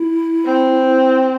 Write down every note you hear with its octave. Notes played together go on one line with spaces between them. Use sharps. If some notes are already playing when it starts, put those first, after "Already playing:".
Already playing: E4
C4